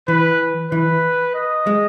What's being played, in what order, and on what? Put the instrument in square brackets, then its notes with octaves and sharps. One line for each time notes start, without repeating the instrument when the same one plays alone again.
[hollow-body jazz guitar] E3 [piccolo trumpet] B4
[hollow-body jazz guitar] E3 [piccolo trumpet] B4
[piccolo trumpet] D#5
[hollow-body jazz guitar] G#3